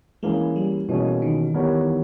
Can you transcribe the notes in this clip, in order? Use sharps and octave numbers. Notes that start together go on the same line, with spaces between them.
E3 G#3 A#3 C#4 E4 G#4
G3
B2 E3 A#3 C#4 G#4 C#5
D#3
G3 B3 E4 A#4 C#5